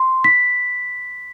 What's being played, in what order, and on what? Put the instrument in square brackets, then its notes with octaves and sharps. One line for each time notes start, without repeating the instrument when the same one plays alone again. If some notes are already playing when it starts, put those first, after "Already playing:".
Already playing: [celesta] C6
B6